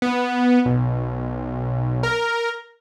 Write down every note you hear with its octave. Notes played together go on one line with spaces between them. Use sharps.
B3
B1
A#4